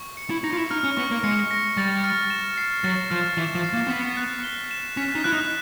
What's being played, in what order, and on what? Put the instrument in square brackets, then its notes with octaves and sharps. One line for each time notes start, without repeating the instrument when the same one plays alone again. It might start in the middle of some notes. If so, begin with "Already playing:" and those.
Already playing: [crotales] C#6
C#7
[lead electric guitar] E4
[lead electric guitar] D#4 [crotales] A#6
[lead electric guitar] F4
E4
[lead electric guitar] D#4 [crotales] F6
[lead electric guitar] C#4
[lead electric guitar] B3 [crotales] C#6
[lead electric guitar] A#3
[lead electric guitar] G#3 [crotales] C#7
[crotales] A#6
[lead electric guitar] G3 [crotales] A6
[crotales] F6
E7
C7
[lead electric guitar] F#3 [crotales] A6
[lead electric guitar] F3 [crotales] F6
[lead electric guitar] E3 [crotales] E7
[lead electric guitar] F3
[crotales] C7
[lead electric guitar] A#3
C4
[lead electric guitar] B3 [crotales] B6
[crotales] F#6
G7
E7
[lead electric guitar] C#4 [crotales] B6
[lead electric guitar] D#4
[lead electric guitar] E4 [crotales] F#6
[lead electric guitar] D#4